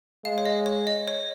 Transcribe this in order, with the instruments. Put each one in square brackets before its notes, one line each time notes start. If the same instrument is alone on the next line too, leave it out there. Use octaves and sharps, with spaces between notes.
[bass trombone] G#3 [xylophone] F5
[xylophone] C#5
D#5
C#5
D#5
C#5